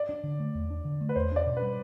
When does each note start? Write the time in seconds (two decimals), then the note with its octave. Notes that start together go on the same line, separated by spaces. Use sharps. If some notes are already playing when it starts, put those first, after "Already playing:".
Already playing: D5
0.09 D4
0.24 D3
0.40 A3
0.55 E2
0.70 D4
0.85 D3
1.01 A3
1.09 B4
1.15 E2 C5
1.32 D4 D5
1.46 B2
1.57 B4
1.62 G3